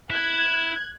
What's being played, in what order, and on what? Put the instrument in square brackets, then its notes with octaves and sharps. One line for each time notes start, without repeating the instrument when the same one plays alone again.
[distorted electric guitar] E4 [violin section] F#6 G#6